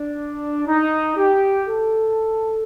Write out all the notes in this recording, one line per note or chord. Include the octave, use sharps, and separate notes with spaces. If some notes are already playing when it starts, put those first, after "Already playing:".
Already playing: D4
D#4
G4
A4